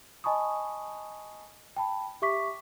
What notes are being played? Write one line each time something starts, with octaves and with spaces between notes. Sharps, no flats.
D#5 G#5 A5 B5 C#6 D#6
G5 A5 B5
G4 E5 C#6 D6 B6